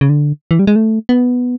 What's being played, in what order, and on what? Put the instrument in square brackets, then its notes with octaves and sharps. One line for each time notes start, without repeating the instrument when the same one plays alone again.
[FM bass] C#3
D3
E3
G3
G#3
A3
B3